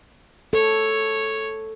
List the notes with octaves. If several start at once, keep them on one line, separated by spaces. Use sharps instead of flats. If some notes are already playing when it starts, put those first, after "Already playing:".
A4 C#5